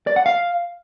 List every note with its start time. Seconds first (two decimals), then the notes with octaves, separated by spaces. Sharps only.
0.07 D5
0.16 F#5
0.26 F5